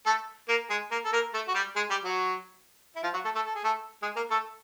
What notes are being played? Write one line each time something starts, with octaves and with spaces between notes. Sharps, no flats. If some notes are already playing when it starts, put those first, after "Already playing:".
A3 A4
A#3 A#4
G#3 G#4
A#3 A#4
A4
A#3 A#4
A3 A4
F#4
G3 G4
G#3 G#4
G3 G4
F#3 F#4
E4
F3 F4
F#3 F#4
A3 A4
A3 A4
A4
G#4
A3 A4
G#3 G#4
A#3 A#4
A3 A4